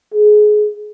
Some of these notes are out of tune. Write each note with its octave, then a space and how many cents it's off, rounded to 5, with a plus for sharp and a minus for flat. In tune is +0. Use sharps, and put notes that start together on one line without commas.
G#4 +20